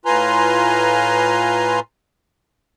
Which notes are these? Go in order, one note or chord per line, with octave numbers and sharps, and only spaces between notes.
A2 F4 B4 G#5 A#5 C6